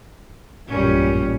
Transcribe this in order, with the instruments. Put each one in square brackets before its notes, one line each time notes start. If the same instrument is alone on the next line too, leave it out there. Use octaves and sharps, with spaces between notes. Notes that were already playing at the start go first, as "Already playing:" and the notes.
[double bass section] A1 F#2 A#2 [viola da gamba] G3 C#4